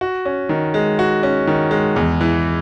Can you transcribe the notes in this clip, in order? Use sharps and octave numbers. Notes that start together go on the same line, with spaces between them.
F#4
C#4
D#3
G#3
F#4
C#4
D#3
G#3
E2
E3